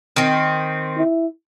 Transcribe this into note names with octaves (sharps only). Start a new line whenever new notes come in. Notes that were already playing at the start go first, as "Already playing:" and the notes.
D#3 C4
E4